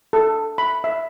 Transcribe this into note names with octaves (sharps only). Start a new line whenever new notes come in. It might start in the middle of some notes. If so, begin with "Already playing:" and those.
A4
B5
E5